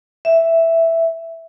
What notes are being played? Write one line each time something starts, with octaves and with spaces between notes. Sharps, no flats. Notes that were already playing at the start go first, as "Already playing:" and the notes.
E5